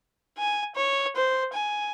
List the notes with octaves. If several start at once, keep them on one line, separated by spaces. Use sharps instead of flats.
G#5
C#5
C5
G#5